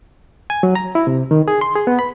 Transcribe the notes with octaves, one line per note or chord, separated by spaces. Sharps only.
G#5
F#3
A#5
E4
C3
D#3
G#4
C6
G#4
B3
B5